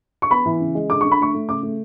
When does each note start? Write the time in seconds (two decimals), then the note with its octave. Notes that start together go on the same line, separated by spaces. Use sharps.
0.22 C#6
0.31 B3 B5
0.46 E3
0.60 C#3
0.75 G#3
0.90 D3 D6
1.01 D3 C#6
1.11 B5
1.20 A3 C#6
1.34 A3
1.49 C#3 D6
1.63 A3